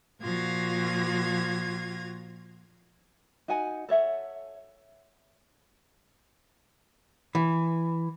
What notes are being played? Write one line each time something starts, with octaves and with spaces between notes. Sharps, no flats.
A#2 F3 F4 F#4 G#6 A#6
D#4 F#4 F#5 G#5
A4 C#5 E5 F#5
E3